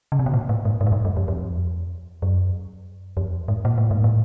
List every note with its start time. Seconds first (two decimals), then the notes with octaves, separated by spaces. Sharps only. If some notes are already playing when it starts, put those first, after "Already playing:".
0.12 C#3
0.19 C3
0.26 B2
0.34 A#2
0.49 A2
0.65 G#2
0.81 G#2
0.87 A2
0.92 G#2
1.05 G2
1.17 F2
1.28 F2
2.22 F#2
3.17 F2
3.48 G#2
3.65 A#2
3.78 A2
3.91 G#2
4.04 A2